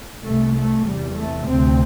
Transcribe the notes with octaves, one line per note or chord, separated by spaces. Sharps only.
C2 C3 A3
A3
E2 C3 G3
A3
D2 C3 C4